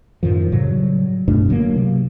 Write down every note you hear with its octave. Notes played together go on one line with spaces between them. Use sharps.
F#2 A2 D#3 F3
A2 C#3 F#3 G3
G2 B2 A3 D4
D3 F#3 A3 A#3
C3